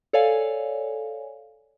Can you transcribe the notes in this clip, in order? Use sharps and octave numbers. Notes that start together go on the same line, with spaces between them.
A4 C#5 D5 F5 G#5